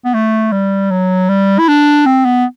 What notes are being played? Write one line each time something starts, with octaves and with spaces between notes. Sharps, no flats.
B3
A3
G3
F#3
G3
E4
D4
C4
B3